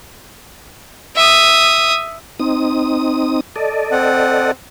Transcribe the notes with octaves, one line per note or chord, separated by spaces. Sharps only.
E5 D#6
C4 D#4 D#6
A4 D5 D#5
C4 F#5